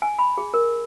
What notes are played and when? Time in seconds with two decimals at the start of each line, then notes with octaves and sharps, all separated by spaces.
0.02 G#5
0.19 B5
0.38 G#4
0.54 A#4